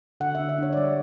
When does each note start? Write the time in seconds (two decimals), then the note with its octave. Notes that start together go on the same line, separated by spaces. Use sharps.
0.20 D3 F#5
0.35 D3 E5
0.49 E5
0.58 D4 C#5
0.73 D5
0.77 G3 C#5